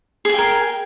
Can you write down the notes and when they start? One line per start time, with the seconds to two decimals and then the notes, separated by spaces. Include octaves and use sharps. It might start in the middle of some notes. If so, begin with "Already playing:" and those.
0.25 G#4
0.29 G#5
0.34 G5
0.38 A#4